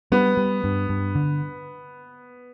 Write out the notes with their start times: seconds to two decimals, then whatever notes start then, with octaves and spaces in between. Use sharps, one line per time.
0.12 G3 B3
0.37 G3
0.64 G2
0.89 G2
1.15 D3